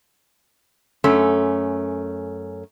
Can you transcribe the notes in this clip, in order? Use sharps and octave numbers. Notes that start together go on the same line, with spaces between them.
F#2 A3 C#4